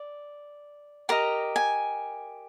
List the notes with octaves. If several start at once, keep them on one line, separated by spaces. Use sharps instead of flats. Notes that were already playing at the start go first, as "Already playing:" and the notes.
Already playing: D5
G4 A#4 D#5 A#5
G#5